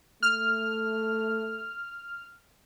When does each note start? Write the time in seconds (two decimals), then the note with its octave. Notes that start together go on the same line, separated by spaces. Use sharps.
0.23 A3 F6